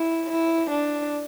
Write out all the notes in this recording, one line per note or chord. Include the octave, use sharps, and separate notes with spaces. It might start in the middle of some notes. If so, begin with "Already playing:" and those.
Already playing: E4
E4
D4